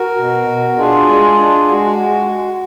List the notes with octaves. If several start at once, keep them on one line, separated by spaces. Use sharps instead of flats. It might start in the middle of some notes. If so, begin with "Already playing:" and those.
Already playing: F#4 A#4
B2
B2
D4 F4 G#4
G#3
D4
G#3 F#4
G#3